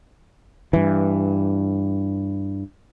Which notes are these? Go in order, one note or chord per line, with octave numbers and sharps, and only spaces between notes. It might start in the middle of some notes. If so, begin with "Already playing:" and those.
G2 E3